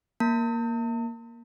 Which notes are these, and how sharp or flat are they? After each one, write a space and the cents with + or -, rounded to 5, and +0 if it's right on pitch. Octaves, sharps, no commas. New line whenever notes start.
A#3 +5 A5 +45